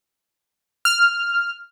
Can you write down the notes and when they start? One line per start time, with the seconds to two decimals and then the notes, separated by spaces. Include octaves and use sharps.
0.85 F6